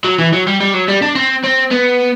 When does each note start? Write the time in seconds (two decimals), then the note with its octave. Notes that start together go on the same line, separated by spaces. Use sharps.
0.05 F#3
0.19 E3
0.33 F#3
0.47 G3
0.61 G3
0.74 F#3
0.88 G3
1.02 D4
1.15 C4
1.44 C4
1.71 B3